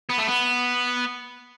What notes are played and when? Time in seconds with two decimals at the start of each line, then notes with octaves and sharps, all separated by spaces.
0.09 B3
0.18 A3
0.27 B3